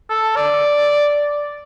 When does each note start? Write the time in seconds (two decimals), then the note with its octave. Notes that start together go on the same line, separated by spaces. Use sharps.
0.10 A4
0.36 D5